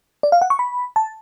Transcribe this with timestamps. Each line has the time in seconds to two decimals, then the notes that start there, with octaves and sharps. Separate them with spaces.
0.23 D5
0.32 F5
0.42 F#5
0.50 C#6
0.59 B5
0.96 A5